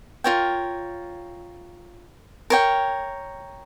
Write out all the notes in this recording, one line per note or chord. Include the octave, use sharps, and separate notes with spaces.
F4 A#4 C#5 G5
A#4 C#5 G5